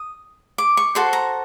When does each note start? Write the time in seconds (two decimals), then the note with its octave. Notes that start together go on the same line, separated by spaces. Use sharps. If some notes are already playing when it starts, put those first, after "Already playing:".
Already playing: D#6
0.58 D6
0.77 C#6
0.95 F#4 A4 C5 C6
1.13 A#5